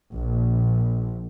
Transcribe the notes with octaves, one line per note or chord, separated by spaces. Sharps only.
A#1